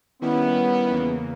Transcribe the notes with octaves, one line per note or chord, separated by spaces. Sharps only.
D#3 G3 B3 C#4 E4
E2 C#3 E3 A#3